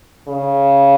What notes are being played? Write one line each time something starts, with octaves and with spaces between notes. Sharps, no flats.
C#3